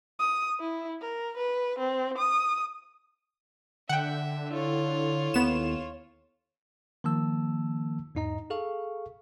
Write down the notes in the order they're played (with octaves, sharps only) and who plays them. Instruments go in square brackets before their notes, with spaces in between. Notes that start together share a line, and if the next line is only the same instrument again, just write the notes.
[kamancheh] D#6
E4
A#4
B4
C4
D#6
[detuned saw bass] D3 [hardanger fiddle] E5 [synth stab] F#5 G5
[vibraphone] E4 A4 [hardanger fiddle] F4 C#5
[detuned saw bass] D#2 [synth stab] B3 E7
[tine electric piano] D#3 F3 A#3 A5 E6
E2 G#2 D#4 D#5 A#5
G#4 A4 F5 C#6